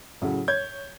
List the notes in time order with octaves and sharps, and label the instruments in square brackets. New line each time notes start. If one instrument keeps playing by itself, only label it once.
[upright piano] A2 C#3 F#3
[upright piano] C#5 [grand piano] G6 G#6